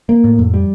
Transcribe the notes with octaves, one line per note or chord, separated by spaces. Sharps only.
A#3
A2
F2
G3